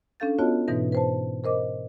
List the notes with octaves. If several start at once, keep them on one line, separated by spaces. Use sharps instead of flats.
C#4 D4 A4 F5 G6 A6
B3 F4 F#4 C#5 D#5 A5
G#2 B2 E3 D#4 B4 A#6
B4 C5 A5
A#4 C5 D#5 D6